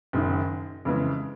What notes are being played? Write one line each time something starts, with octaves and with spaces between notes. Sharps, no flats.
F#1 F#2 D#3
F2 C#3 E3 G#3